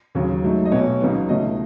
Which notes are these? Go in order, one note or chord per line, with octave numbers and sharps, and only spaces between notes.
D#2 C#3 F#3
G#2 F#3 A3 D#4
D#5
B1 B2 A3 C#5
C#2 C#3 F#3 B3 D#4
C#2 B2 A3 D#4 D#5